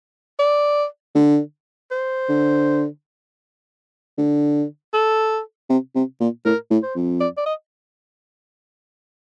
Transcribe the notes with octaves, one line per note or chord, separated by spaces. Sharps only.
D5
D3
C5
D3
D3
A4
C3
C3
A#2
A2 A#4
A2
C5
F2
D5
D5
D#5